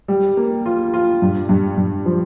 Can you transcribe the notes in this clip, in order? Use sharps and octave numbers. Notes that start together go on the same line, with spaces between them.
G3
A#3
F4
F4
G2
G2
G2
F3